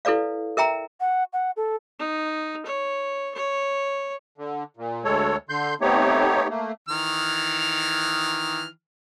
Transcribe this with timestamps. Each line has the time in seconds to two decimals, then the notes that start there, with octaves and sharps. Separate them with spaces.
0.05 E4 A4 B4 D5 F5
0.57 A#4 E5 G5 A#5
1.00 F#5
1.33 F#5
1.57 A4
1.99 D#4
2.66 C#5
3.35 C#5
4.38 D3
4.77 A#2
5.04 D2 G#3 A4 C#5
5.49 D3 C6 G6
5.81 A3 B3 C4 D#4 G4 C#5
6.49 A3 A#3
6.89 D#3 E3 F6